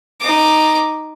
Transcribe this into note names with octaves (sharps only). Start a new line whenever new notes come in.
D#4 D6